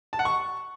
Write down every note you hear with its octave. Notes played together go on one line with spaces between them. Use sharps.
A5
F#5
C#6